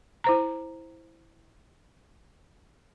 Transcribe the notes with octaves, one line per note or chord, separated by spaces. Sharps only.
E4 C5 A#5